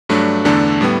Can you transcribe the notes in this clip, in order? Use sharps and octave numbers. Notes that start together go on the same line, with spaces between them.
G2 F#3 A3 D4
E2 D3 A3 D4 A4
A2 G3 B3